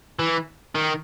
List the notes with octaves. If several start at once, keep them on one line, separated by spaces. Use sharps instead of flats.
E3
D#3